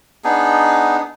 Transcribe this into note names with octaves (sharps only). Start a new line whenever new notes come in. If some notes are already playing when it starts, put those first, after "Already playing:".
B3 D4 D#4 G#4